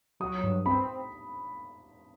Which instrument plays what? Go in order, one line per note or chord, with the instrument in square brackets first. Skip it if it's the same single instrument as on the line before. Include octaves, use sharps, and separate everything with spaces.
[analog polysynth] F#3 [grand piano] D#6
[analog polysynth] G2
[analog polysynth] C4 [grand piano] B5